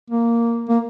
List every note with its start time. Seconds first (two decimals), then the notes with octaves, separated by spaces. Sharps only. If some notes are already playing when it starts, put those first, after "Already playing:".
0.10 A#3
0.69 A#3